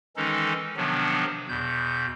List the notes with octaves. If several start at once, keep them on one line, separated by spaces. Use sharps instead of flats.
D#3 E3 G#3 C#4 D#4 A4
C3 D#3 F3 F#3 B3 D4
E2 B2 G6